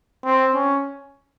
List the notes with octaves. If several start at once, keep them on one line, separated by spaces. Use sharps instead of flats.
C4
C#4